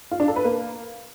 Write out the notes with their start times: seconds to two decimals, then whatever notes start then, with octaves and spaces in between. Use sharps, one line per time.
0.11 F4
0.20 D4
0.28 A4
0.36 B4
0.44 A#3